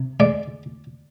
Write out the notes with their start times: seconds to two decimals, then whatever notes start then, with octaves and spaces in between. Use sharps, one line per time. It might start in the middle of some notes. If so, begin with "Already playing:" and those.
Already playing: C3
0.20 G#3 D5